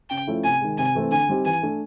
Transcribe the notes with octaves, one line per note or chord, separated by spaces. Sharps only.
C#3 G5
F3 A3 C#4 E4
C3 G#5
D#3 G#3
C3 G#5
E3 A3 C4
D3 G#5
G3 C4 D#4 G4
E3 G#5
A3 D4